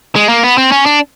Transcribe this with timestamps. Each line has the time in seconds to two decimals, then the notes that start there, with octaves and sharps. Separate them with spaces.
0.16 G#3
0.29 A#3
0.44 B3
0.58 C4
0.72 C#4
0.86 D4